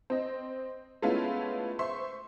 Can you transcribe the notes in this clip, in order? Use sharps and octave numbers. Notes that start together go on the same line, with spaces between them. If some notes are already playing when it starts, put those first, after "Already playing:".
C4 D#5
G#3 A3 B3 C#4 E4 F4
C5 E5 C6 C#6